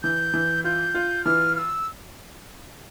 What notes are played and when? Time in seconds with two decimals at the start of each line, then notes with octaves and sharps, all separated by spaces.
0.03 E3 G6
0.34 E3
0.64 F4 G6
0.94 F4
1.25 E3 F6
1.55 F6
1.59 E6